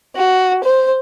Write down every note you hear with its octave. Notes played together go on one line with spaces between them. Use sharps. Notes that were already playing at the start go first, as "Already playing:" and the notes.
F#4
C5